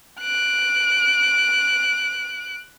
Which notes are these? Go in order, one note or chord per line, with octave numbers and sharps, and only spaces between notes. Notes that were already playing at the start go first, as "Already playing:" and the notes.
F#6 D7